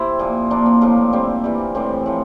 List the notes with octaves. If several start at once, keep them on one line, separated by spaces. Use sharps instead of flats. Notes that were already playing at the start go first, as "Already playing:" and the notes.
Already playing: C3 C4 E4 G4
A#2 F3
A#2 F3 A#3 D4
C4
A2 F3 A#3
A#2 G3 C4
C3 E3 G3
A2 E3 G3 C4
A2 F3